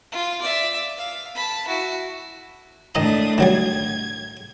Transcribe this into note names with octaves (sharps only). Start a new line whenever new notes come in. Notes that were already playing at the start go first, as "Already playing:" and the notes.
F4
D5 E5
F5
A5 B5
E4 F#4
A2 D#3 D4 D#5 A#5 D#6
D#3 F#3 G3 G#6